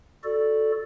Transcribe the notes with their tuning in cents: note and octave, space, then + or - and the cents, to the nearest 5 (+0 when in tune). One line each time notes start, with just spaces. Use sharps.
F#4 -5 A4 +0 D5 +0